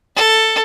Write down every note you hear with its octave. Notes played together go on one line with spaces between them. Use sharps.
A4